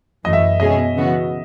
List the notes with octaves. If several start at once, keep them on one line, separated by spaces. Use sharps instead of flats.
F#2 E3 A3 D#5
E5
B2 G#3 C#4 G#4 D#5
C#3 E3 B3 F#4